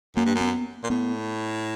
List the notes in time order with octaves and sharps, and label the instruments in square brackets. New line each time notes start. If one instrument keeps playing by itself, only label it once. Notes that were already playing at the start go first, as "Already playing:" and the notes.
[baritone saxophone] F#2 [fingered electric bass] A#3
[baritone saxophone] G2
F#2
[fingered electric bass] B3
[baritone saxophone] A#2
[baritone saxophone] A2 [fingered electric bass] B3